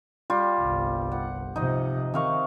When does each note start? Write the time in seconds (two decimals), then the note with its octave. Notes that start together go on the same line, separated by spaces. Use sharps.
0.30 G3 F4 G4
0.61 G1 C2
1.12 F#5
1.56 C3 F3 D#4 D#5
2.14 C3 D#3 F5 C#6